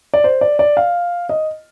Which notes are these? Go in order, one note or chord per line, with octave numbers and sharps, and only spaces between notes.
D5
C5
D5
D5
F5
D#5